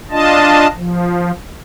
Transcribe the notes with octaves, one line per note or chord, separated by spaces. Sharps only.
D4 F4 D#5 A5
F3